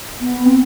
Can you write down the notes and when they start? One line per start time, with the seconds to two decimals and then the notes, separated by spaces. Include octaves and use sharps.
0.21 B3
0.46 C4